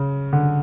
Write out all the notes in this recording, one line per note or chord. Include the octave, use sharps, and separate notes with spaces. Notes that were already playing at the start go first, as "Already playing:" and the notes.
Already playing: C#3
D3